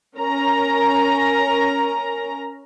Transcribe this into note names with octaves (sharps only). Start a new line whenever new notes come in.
C#4 A#4 A#5